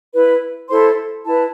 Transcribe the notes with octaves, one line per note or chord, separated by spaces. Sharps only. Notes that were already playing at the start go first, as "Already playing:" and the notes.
E4 B4
E4 A4 C5 C6
E4 B4 A5